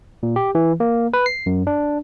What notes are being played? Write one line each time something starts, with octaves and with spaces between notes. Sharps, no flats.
A#2
G4
E3
A#3
B4
C7
F#2
D4